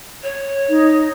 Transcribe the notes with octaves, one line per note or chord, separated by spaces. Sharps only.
C#5
D#4